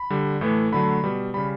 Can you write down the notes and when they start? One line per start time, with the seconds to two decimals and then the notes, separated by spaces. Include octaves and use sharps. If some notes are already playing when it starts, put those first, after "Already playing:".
Already playing: B5
0.10 D3 G3
0.41 A2 E3 A3
0.72 D3 F#3 A3 B5
1.03 B2 G3
1.34 C#3 G3 B5